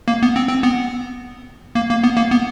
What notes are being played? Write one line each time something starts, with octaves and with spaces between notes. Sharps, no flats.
A#3
B3
C4
C4
B3
A#3
A#3
B3
A#3
B3